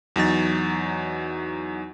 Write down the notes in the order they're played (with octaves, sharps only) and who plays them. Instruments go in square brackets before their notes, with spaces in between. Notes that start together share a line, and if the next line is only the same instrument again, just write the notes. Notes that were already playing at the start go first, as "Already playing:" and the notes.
[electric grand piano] E2 F#3 D#4 A6